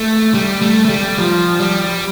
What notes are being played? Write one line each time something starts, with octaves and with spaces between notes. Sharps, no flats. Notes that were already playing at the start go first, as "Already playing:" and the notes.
Already playing: A3
G3
A3
A3
G3
F3
G3